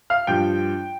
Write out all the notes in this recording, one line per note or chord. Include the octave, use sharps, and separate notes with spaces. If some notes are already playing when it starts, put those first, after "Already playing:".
F5 F6
G2 F3 G5 G6